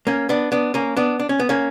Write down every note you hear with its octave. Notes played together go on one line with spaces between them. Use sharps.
A#3 C#4
B3 D4
B3 D4
A#3 C#4
B3 D4
D4
C#4
B3
A#3 C#4